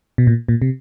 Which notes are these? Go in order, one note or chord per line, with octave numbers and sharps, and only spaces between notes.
B2
A#2
A#2
C3